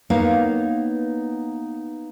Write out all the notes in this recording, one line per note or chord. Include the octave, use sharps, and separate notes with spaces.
A#3 B3 D#4 B4 C#5 F5